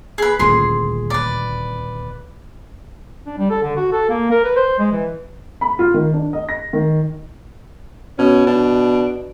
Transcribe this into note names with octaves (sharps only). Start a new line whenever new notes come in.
G#4 B4
D#1 D2 A#2 G#4 C6
B4 D5
D4
G3
A4
D3
F#4
A4
A#3
A#4
B4
C5
G#3
E3
B5
F4
D#3
D4
D#5
A#6
D#3
B2 C#4
B2 D4